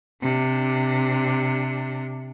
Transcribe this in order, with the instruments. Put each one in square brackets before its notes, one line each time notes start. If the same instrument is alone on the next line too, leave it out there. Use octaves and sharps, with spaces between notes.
[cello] C3 D4